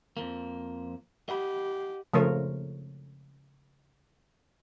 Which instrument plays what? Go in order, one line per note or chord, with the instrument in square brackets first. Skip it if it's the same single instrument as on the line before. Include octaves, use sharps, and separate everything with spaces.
[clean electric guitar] F2 F3 A#3
[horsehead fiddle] G4 [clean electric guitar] D#5 F#5 B5
[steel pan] C#3 F3 A3 A#4 C#5